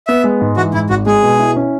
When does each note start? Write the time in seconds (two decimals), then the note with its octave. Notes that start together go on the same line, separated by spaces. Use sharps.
0.07 B3 E5
0.24 G#3
0.41 G#2
0.57 E3 F#4
0.73 G#2 E4
0.90 G#1 F#4
1.06 G#3 G#4
1.23 B2
1.39 E4
1.56 C#4